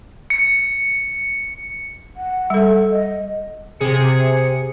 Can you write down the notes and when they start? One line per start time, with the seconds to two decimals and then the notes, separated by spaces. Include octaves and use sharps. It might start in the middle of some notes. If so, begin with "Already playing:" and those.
0.30 C#7
2.16 F#5
2.50 G3 A4
2.91 D#5
3.80 C3 G#4 C#7